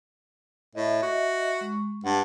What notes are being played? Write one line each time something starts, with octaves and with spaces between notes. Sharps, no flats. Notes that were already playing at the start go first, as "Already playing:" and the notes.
A2 D#5 E5
F#4
G#3 C#6
G2 F#5 A5